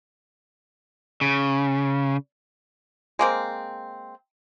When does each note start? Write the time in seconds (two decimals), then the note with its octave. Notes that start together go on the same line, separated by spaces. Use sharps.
1.21 C#3
3.19 G#3 A#3 C4